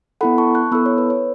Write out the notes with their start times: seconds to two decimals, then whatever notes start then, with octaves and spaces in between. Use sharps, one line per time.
0.21 B3 E4 A4 F#5 B5
0.38 A5 C#6
0.55 C#6 F#6
0.72 B3 E4 A4 B5 E6
0.86 C#5
0.98 B4
1.10 C#5